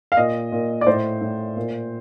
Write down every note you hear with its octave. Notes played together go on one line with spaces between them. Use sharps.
F5
A#2 D#5
A#2
D5
A2 C5
A2
A#2